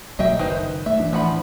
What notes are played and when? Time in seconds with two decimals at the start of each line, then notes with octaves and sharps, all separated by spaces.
0.19 B1 F#3 A#3 D#5 E5 G5
0.39 F#1 C2 D#3 D#4 B4 C5
0.86 A3 E5
1.00 A1 E3 D4
1.13 F3 F#5 B5